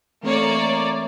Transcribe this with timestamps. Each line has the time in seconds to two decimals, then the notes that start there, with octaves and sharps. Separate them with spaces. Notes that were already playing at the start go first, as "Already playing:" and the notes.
0.23 E3 A3 A#3 C4 C#5 D5